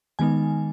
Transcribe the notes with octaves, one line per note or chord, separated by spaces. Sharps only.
D#3 G#3 B3 D#4 G#5